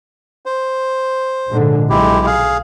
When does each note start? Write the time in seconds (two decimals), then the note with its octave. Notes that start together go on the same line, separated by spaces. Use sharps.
0.46 C5
1.50 A#1 G#2 D3
1.90 B1 G#3 E4 G4
2.26 G#4 F5